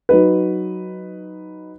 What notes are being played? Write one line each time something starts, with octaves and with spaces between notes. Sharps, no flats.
F#3 D#4 B4